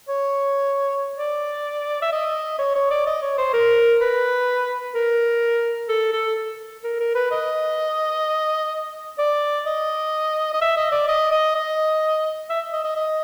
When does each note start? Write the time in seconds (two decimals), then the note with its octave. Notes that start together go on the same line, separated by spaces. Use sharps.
0.09 C#5
1.17 D5
2.02 E5
2.12 D#5
2.59 C#5
2.75 C#5
2.90 D5
3.07 D#5
3.22 C#5
3.38 C5
3.53 A#4
4.01 B4
4.94 A#4
5.89 A4
6.13 A4
6.84 A#4
7.00 A#4
7.15 B4
7.31 D#5
9.19 D5
9.66 D#5
10.53 D#5
10.61 E5
10.77 D#5
10.92 D5
11.08 D#5
11.31 D#5
11.54 D#5
12.50 E5
12.73 D#5
12.84 D#5
12.96 D#5